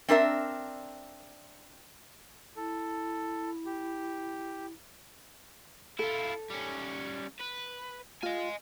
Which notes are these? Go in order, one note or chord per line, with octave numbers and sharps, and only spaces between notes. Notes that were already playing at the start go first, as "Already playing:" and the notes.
C4 D4 A#4 E5
E4 A4
G4
E4 F4 A4
G3 C#4
B4
F4 D#5 G#5